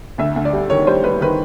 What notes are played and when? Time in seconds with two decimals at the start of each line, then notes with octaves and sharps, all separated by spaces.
0.18 D2 E5
0.36 D2
0.45 D5
0.53 G3
0.70 D#3 C#5
0.87 G3 C5
1.04 G3 B4
1.21 D#3 B4